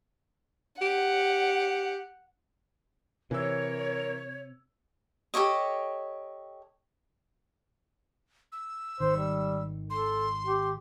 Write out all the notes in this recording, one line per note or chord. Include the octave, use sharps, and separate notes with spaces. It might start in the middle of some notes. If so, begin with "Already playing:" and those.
G4 F#5
C3 E3 A#4 C#5 E6
G4 A4 C#5 D#5
E6
G#1 D#3 C5
G3
A4 C6
G4